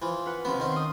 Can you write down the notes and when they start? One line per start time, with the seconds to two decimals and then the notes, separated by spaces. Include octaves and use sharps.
0.02 E3 F3
0.26 F4 B4 F#5
0.45 C3 F3 B3 C#4 C6
0.60 D#3 C4
0.72 C6 D#6